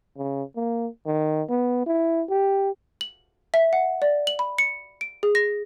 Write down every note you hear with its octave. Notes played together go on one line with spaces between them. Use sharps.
C#3
A#3
D#3
B3
E4
G4
F#7
E5
F#5
D5
F#7
B5
C#7
D7
G#4
A#6